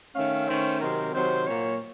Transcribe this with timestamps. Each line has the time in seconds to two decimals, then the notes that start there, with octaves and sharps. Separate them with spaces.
0.16 D#3 A3 C#4 F5
0.48 D#3 A3 C#4 C5
0.81 C3 D#3 F#3 C4 A#4
1.14 C3 D#3 F#3 C4 C5
1.47 A#2 F#3 A#3 C#5